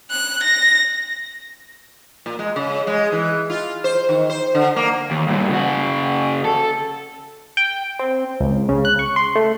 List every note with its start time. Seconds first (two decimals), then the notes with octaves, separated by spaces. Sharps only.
0.11 F#6
0.44 A#6
2.26 A#2
2.39 G#3
2.56 C#3
2.87 G#3
3.12 E3
3.50 F4
3.84 C5
4.09 D#3
4.30 C5
4.55 D3
4.76 A#3
5.11 D#2
5.28 G2 A#2
5.49 C#3 F#4
6.45 A4
7.57 G5
7.99 C4
8.40 C#2
8.69 C#3
8.85 F#6
8.99 C#6
9.16 C6
9.35 A3